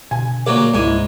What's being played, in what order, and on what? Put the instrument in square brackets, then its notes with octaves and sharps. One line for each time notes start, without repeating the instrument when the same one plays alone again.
[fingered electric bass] B2 D3 [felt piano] G#5
[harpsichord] A#2 F#3 D5 [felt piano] A#4
[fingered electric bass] C#2 C3 G3 [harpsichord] G#2 G#5 [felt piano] G#3 E4